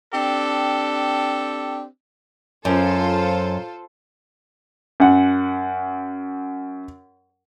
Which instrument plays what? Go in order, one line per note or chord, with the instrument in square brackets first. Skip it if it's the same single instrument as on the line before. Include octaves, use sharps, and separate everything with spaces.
[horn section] C4 D4 G4 A4
[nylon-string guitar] F#2 [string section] F4 A4 C5
[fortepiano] F#2 F#5